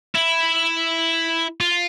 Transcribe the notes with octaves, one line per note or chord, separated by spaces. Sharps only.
E4
F4